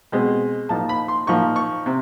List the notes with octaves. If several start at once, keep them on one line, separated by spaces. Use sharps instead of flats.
B2 G#3 C4
A#2 F3 A#3 D#4 A5
B5
C6
A#2 F3 A#3 D#4 C#6
C#6
C3